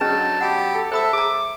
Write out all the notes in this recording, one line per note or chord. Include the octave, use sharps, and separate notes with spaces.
D3 F#3 C#4 D#4 G#4 B4 A5
F#3 B3 G4 F#5
A4
A4 C5 E5 B5 D#6
G#4 A#5 D6